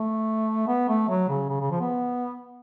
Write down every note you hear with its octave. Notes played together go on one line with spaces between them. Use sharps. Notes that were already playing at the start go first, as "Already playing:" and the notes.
Already playing: A3
B3
A3
F#3
C#3
C#3
C#3
F3
B3